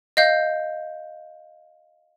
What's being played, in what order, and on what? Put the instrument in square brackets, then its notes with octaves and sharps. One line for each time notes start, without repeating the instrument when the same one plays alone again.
[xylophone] D#5 F5 G6